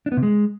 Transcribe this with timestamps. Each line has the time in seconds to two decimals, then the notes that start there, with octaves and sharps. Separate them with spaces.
0.06 D4
0.12 B3
0.17 C3
0.23 G#3